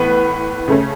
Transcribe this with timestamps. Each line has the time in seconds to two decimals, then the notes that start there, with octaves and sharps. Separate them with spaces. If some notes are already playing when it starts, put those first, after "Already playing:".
Already playing: A2 E3 B3 B4
0.68 C#3 A3 C#4